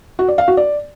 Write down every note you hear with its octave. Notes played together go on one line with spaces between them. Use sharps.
F#4
D5
F5
F#4
D5